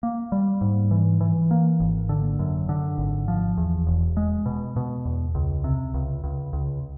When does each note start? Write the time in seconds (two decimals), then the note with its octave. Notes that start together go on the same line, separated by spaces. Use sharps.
0.03 A#3
0.32 G3
0.61 G#2
0.91 E3
1.21 E3
1.51 A#3
1.80 G#1
2.09 D3
2.39 F#2
2.69 D3
2.98 G#1
3.28 F3
3.58 E2
3.87 E1
4.17 G#3
4.46 B2
4.76 B2
5.05 E2
5.35 C#2
5.64 C3
5.94 C#2
6.24 C#2
6.53 C#2